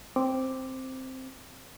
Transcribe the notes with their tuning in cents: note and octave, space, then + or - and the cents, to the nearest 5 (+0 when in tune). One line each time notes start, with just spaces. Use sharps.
C4 +0 D6 +0